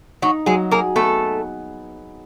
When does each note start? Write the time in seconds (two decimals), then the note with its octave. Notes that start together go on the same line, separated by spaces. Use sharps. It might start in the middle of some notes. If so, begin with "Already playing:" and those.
0.22 F#3 D#4 F#4
0.46 F#3 G#3 G#4
0.71 A#3 G#4 A#4
0.95 A3 B3 A4